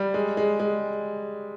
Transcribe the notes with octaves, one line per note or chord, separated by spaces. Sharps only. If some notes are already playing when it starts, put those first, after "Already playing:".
Already playing: G3
G#3
G#3
G#3